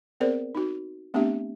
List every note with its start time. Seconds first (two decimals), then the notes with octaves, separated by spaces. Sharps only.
0.20 B3 C4 G#4 A#4 C5 D5
0.55 D#4 F#4
1.14 A3 B3 C4 D4 G4 E5